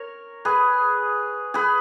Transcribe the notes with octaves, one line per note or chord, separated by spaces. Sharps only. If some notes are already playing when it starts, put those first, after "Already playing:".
Already playing: A#4 C#5
G#4 B4
G#4 B4